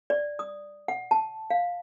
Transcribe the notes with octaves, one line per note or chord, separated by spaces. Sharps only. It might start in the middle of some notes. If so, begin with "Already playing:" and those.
D5
D#6
F#5
A5
F5